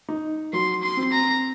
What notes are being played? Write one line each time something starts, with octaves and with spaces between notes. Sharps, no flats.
D#4
F#3 C6
C6
C4
A#5